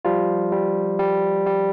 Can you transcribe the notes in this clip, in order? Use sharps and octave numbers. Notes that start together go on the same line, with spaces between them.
F3 G3 F4
G3
G3
G3